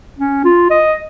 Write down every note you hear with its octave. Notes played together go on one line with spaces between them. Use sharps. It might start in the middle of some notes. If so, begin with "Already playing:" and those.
C#4
F4
D#5